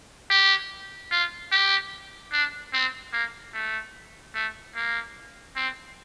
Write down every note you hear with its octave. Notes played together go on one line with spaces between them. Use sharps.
G4
F4
G4
D4
C4
A#3
A3
A3
A#3
C4